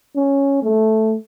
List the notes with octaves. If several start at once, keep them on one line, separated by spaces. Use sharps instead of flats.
C#4
A3